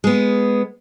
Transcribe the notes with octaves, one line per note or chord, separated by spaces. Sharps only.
G#3 B3